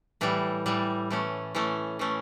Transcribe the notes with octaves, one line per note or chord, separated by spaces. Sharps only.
A2 E3 G3
A2 E3 G3
E3 A3 C#4
E3 A3 C#4
E3 A3 C#4